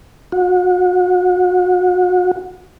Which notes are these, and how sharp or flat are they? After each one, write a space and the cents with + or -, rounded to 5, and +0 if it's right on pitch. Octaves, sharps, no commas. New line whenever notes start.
F#4 -35